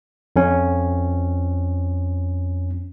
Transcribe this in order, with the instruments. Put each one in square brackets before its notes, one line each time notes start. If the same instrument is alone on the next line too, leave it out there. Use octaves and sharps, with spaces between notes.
[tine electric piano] F2 C#4